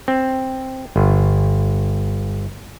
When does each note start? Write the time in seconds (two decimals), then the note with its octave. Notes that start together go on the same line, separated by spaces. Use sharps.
0.08 C4
0.96 G1